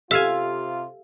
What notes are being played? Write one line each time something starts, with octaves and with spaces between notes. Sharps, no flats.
C3 F4 G4 A4 E5 F5 G#5 F6